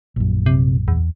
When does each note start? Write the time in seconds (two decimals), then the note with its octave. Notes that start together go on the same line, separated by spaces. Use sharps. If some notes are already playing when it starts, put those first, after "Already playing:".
0.16 A#1 F#2
0.46 C3
0.88 E2